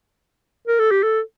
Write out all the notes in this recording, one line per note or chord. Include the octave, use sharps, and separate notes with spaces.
A#4
A4
G4
A4